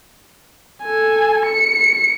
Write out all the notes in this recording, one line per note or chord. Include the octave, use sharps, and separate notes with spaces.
A4 G#5
C#7